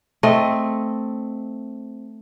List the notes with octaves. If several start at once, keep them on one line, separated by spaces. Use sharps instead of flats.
A3 C4 D#5